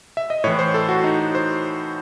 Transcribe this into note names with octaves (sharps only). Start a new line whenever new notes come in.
E5
D#5
A2 E3 C#5
C5
A4
F#4
D#4
F#4
C5